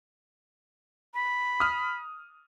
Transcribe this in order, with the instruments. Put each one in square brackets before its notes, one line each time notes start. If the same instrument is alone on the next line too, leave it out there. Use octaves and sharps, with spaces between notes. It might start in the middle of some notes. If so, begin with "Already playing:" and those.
[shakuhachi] B5
[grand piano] D#6 F6